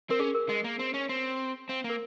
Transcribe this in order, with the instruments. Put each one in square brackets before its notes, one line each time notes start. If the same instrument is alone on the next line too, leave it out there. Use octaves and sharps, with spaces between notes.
[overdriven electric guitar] C4 [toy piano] A#4
[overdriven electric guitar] C#4 [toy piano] G#4
[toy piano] A#4
[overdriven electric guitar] G#3 [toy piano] D#5
[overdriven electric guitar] A#3
C4
C#4
C4
[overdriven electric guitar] C4 [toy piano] F5
[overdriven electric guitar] A#3
[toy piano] A#4